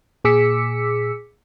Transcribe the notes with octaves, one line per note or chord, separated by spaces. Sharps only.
A#2 G#4 D6 E6 B6 C#7